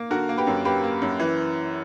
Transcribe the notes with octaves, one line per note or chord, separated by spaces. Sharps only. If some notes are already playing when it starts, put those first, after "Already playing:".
Already playing: A#3
D3 F#4 A#4
A#3
G4 B4
F#2
A#3 G4 B4
A#3
F#2
E3